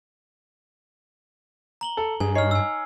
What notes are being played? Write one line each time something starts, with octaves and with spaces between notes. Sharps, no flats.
A#5 F#7 G7
A4
G2 G#4 G#5
D#4 C#5 D#5 F6 C7
G#5 E6